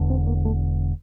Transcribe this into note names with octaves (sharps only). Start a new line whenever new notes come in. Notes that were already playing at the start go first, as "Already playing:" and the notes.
Already playing: E1 E2 D3
C4
A#3
A3